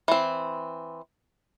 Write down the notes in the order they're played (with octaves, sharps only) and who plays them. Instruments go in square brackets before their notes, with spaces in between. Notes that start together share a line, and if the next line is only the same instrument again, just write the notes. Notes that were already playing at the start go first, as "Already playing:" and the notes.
[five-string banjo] E3 C4